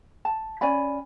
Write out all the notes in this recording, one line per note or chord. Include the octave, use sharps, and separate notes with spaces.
A5
C#4 D5 G#5 B5